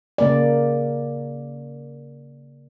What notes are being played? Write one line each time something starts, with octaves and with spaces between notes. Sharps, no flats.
C#3 A#3 A#4 D5